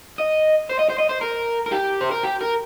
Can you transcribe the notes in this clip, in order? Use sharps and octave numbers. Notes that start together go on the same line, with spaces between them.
D#5
C5
D#5
C5
D#5
C5
A#4
A#4
G4
C5
A#4
G4
A#4